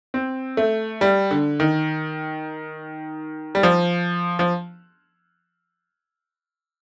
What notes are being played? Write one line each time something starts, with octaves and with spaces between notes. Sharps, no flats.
C4
A3
G3
D3
D#3
G3
F3
F3